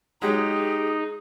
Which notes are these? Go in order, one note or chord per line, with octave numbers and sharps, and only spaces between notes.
F#3 G#3 D#4 G4 G#4